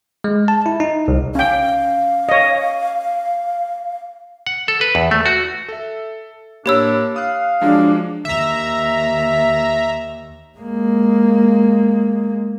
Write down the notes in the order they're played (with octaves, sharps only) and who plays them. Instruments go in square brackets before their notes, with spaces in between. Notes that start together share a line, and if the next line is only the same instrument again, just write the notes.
[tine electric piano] G#3
A5
E4
D#4
C2
[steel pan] C#4 G5 [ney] F5
[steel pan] C#5 D#5
[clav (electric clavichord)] F#5
A4
B4
E2
A3
F#4
[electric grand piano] A4 E5
[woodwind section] A2 D4 [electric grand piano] A#3 B5 [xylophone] G4 C#5 E6
[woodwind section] F5 [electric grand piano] D#6 F#6
[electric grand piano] F3 F#3 G#3 [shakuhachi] D4
[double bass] D#2 [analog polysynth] E5 A#5
[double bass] G#3 A#3